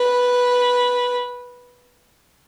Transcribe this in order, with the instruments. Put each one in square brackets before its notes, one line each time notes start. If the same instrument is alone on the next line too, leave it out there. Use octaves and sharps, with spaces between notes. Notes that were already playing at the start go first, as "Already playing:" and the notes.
Already playing: [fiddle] B4